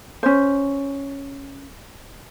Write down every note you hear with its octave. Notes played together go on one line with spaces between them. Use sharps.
C#4 C5